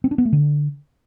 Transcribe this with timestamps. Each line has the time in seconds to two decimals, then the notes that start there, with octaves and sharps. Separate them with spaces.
0.04 C4
0.11 D4
0.18 B3
0.25 A3
0.32 D3